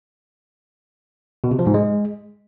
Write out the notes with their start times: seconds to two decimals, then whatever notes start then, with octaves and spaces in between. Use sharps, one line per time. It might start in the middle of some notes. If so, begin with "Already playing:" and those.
1.44 B2
1.51 C3
1.59 F3
1.67 G#2
1.74 G#3